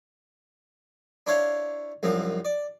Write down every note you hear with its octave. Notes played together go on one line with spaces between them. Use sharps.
D4 E4 C5 C#5 F5
C2 F#2 F3 C4
D5